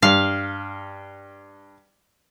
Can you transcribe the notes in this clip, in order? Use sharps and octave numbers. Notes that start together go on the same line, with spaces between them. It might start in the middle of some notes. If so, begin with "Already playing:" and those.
G2 F5